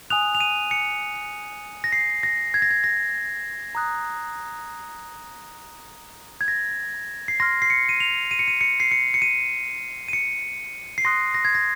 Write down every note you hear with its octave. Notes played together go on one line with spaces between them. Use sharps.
G#5 D#6 F#6 F7
F7
D#7
C#7
A#6
C7
A#6
G#6
A#6
G#6
A#6
A#5 D#6 F#6
G#6
A#6
C7
C6 F6 A#6
C7
C#7
D#7
F7
D#7
C#7
D#7
C#7
C7
C#7
C#7
D#7
D#7
C#7
C7
C6 D#6 F#6 A#6
A#6
G#6
A#6